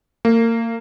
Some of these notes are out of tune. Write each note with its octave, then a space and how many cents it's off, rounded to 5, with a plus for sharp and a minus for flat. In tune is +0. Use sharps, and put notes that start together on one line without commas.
A#3 -30